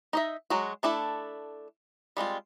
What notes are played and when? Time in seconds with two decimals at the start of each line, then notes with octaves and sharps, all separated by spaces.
0.13 D#4 D#5 E5
0.50 F#3 G#3 F#4
0.83 A3 D4 E4 A4
2.17 G3 G#3 C4 F4